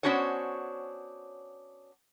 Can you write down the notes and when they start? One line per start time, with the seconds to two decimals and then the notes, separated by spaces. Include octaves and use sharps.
0.03 B3 C#4 D4 F#4 C5 C#5